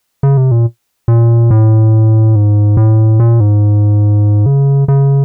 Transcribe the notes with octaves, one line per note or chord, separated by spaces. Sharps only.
C#3
C3
A#2
A#2
A2
G#2
A2
A#2
G#2
C#3
C#3